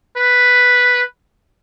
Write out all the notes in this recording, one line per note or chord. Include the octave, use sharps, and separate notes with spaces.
B4